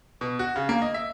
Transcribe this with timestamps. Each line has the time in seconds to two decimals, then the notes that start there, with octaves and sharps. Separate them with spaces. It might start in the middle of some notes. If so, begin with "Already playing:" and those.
0.21 B2
0.39 F#4
0.56 C#3
0.69 A#3
0.82 D#5
0.94 E5